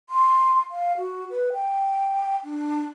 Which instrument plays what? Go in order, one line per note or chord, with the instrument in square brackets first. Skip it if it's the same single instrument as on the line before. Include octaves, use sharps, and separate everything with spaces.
[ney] C6
F5
F#4
B4
G5
D4